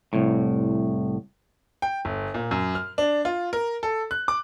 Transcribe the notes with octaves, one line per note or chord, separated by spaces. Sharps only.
C2 A2
G5
G1
A#2
F#2
F6
D4
F4
A#4
A4
F#6
D6